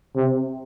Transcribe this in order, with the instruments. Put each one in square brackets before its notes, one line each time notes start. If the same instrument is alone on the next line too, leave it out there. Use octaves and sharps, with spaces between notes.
[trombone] C3